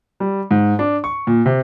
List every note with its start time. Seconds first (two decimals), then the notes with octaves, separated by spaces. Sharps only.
0.20 G3
0.51 G#2
0.79 D4
1.04 C#6
1.27 A#2
1.46 C3